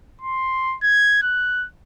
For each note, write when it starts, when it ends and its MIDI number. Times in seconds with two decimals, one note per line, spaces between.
0.21 0.76 84
0.83 1.19 92
1.23 1.66 90